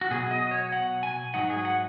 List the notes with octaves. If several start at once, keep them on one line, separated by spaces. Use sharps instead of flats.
F#4
B2 F#3 B3 G#4
D#5
C#5
F#5
G#5
G#2 F#3 D#4 F#5
G#4
F#5